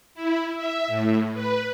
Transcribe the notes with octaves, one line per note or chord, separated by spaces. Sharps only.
E4
E5
A2
B4